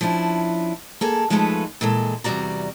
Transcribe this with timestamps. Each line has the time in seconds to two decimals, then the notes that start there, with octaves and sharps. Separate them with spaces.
0.01 F3 C#4 D4 E4
1.01 A#3 G#4 A4
1.30 F3 G#3 A3 D#4 A4 B4
1.81 A#2 E3 G#3 A4
2.24 E2 C3 G3 F#4 D5 A#5